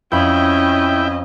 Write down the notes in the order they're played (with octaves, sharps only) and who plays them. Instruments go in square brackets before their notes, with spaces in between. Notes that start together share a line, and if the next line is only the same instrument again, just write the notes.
[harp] F2 B5 [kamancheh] C#4 D#5 [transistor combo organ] E4 G5